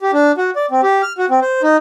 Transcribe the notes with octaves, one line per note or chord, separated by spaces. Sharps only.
G4
D4
F#4
D5
C4
G4
F6
F#4
C4
C5
D#4